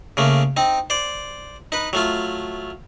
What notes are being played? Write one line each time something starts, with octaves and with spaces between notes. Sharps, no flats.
C#3 A3 A#3
C4 D#4
C5 D5
D#4 B4
F#3 A3 F4